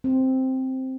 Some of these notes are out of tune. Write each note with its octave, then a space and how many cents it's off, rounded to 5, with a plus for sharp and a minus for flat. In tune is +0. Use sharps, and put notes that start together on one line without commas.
C4 +0